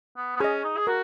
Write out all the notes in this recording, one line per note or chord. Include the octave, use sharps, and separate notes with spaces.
B3
B3
C#4 G#4 D#5
D#4
G#4
F#4 A#4